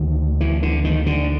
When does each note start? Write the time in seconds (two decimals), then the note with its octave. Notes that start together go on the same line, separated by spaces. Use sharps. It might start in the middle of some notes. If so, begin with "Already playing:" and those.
Already playing: D2 D#3
0.41 E3
0.63 D3
0.84 D#3
1.06 D3